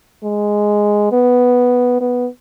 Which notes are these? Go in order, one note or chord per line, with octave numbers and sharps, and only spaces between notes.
G#3
B3
B3